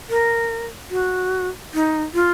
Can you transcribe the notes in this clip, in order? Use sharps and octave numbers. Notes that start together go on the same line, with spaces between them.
A#4
F#4
D#4
F4